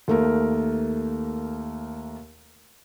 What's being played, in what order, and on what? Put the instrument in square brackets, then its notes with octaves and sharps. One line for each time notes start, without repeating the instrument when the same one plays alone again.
[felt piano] D#2 A3 A#3 A#4